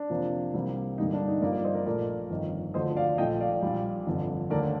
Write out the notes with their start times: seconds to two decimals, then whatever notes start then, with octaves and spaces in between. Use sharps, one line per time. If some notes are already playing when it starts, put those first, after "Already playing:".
Already playing: D4
0.10 F2 C3 F3 A#3
0.54 C2 C3 G3 A#3
0.98 G2 D3 G3 A#3 D#4
1.13 D4
1.28 D#4
1.42 G2 F3 A#3 A#4 D5
1.53 D5 F5
1.64 C5 D#5
1.75 A#4 D5
1.86 A#1 A#2 A3 A#4 D5
2.30 G1 F2 D#3
2.74 D2 D3 F3 A3 C5 D#5
2.96 D5 F5
3.18 A#1 A#2 A3 D#5 G5
3.40 D5 F5
3.63 A#1 A#2 G3
4.07 G1 F2 D3
4.50 D#2 D3 A3 A#4 D5